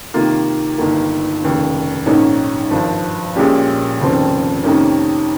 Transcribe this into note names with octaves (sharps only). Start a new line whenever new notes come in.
C3 D#3 A#3 F4
G1 G2 D#3 A#3
F1 D#2 C#3
A#1 G#2 D#3 A#3 C#4
G#1 G2 F3
A#1 A#2 G#3 C#4 G4
F1 D#2 C#3 F3 C4
F2 C3 D#3 A#3 C#4